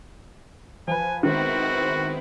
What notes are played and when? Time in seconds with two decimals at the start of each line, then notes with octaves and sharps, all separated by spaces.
0.88 F3 B4 G#5
1.23 D#3 G#3 B3 C4 E4 F#4